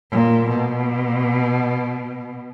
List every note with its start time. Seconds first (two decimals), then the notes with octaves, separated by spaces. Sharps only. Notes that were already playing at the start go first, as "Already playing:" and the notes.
0.11 A#2
0.50 B2